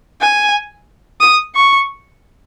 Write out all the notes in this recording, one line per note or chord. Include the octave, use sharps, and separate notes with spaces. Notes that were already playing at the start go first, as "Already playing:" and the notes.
G#5
D#6
C#6